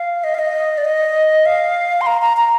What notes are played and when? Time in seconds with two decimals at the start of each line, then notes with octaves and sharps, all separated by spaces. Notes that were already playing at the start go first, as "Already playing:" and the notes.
Already playing: F5
0.24 D#5
0.35 F5
0.39 D#5
0.78 D5
0.85 D#5
1.46 F5
2.01 C6
2.07 A#5
2.22 A#5
2.37 A#5